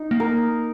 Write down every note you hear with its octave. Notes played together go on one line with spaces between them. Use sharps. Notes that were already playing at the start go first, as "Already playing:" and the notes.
Already playing: D#4
A#3
A#4